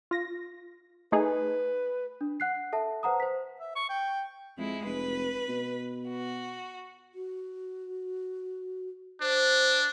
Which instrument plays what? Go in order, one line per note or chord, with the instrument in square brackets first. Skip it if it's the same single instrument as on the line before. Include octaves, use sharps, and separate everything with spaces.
[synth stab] F4 A#6
[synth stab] A3 D#4 G#4 [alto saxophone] B4
[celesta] D4
F#5 F#6 C7
A4 E5 A5
B4 C5 F#5 A#5 D#6
C5 B6
[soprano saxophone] E5
C#6
G5
[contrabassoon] F2 [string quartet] G#3 E4
[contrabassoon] F1 [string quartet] B4
[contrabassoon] B2
[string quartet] F#4
[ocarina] F#4
[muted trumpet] D4 [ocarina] C5